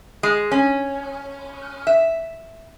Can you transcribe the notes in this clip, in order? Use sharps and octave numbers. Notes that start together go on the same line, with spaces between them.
G#3
C#4
E5